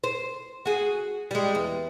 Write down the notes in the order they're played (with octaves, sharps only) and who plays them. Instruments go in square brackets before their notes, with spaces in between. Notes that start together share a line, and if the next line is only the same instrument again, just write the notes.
[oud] C5
F#4 G#4
G3 G#3
E2